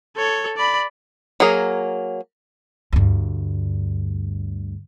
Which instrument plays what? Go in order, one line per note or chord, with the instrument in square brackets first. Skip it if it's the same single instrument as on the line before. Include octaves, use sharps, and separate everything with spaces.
[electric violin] A4 C#5
D5 B5
[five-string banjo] F#3 A#3 G#4 A#4
[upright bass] D2 G2